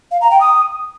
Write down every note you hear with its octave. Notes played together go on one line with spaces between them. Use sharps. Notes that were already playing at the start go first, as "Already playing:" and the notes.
F5
A#5
G5
D#6